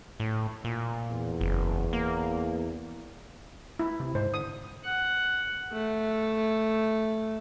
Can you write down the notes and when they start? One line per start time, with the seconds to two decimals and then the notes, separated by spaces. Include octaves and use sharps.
0.20 A2
0.65 A#2
1.10 E2
1.41 F#1
1.93 A#3
3.79 E4
4.00 C3
4.15 G#2 C5
4.34 D3 D#6
4.84 F#5
5.72 A3